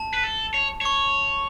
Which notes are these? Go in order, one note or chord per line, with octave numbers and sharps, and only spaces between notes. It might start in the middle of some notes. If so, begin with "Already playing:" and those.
Already playing: A5
B4
A4
C#5
C#5 C#6